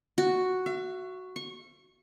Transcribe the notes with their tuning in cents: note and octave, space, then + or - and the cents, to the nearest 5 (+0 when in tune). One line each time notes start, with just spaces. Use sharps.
F#4 +0
E5 +45
C#6 -25